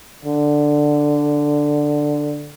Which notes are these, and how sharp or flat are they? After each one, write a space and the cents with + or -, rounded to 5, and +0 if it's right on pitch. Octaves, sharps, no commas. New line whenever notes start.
D3 +5